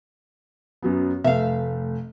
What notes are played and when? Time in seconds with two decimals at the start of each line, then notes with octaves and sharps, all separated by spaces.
0.82 F#2 F#3 B3
1.24 F1 A3 E5 F5